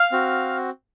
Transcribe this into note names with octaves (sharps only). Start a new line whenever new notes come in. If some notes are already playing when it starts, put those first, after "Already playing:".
Already playing: F5 F6
C4 F#4